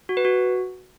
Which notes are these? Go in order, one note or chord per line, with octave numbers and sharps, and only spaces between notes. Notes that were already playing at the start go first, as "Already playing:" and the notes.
F#4
B4
F#4